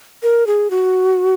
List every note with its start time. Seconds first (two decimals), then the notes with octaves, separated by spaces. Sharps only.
0.23 A#4
0.47 G#4
0.70 F#4